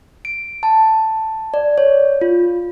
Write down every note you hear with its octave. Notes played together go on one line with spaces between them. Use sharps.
D7
A5
D5
C#5
F4